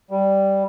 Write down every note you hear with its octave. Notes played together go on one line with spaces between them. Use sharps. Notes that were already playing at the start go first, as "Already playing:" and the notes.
G3